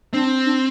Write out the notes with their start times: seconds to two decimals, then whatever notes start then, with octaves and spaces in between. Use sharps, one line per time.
0.13 C4 D4
0.46 D4